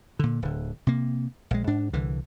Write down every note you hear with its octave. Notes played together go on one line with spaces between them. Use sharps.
A#2 D3
D1 D3
C3 A#3
A#1 G#3
G#2 D4
C2 D3 E3